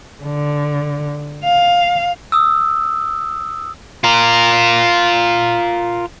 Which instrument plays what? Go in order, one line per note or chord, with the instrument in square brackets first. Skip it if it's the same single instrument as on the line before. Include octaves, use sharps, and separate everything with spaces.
[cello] D3
F5
[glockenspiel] D#6 E6
[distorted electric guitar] F4 A#4